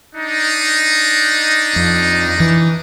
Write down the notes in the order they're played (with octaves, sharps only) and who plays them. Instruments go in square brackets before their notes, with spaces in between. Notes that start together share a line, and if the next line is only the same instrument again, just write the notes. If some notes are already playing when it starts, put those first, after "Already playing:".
[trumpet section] D4 D#4
[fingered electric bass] F2
E3